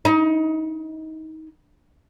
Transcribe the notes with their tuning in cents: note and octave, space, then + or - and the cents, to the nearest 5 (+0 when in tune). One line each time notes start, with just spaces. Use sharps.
D#4 +25